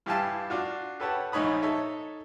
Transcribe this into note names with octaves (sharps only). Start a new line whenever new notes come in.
G2 E3 G4 F5 G#5 A5
D4 F4 F#4
G4 A4 B4 C#5 F#5 A5
A#1 G#2 D#4 C#5 B5 D#6
D#4 A4 C#5 E5